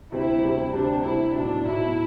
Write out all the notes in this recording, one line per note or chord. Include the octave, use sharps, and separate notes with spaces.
D2 C3 G3 C4 E4
D2 C3 G3 C4
D2 C3 G3 C4 D4
D2 C3 G3 C4 E4
B1 A2 F#3 D4
B1 A2 F#3 E4